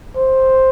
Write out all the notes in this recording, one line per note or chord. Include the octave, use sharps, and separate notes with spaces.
C5